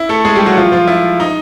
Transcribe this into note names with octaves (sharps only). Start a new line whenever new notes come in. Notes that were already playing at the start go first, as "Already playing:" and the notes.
Already playing: E4
A3 A4
G#3 G#4
G3 G4
F#3 F#4
F3 F4
F3 F4
E4
D#4